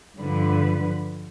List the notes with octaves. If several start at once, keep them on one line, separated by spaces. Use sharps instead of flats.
G2 D3 F3 B4